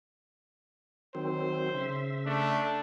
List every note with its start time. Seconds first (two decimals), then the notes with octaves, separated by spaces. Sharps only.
1.15 D#3 F#3 C4 C5
1.74 C#3 E5
2.26 A3 D4